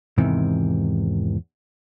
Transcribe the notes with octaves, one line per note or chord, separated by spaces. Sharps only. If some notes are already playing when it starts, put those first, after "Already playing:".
E2 G#2 C3 D#3 E3